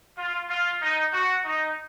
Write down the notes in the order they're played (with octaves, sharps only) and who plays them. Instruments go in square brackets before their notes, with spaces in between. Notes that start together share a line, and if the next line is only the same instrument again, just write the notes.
[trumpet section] F4
F4
D#4
F#4
D#4